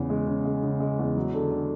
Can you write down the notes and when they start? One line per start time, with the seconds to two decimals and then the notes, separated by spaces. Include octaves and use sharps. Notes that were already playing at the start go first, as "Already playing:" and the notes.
Already playing: E2 C#3
0.10 G#3
0.27 C#3
0.45 G#3
0.63 C#3
0.80 G#3
0.99 E2
1.16 F#3
1.34 D3
1.51 D3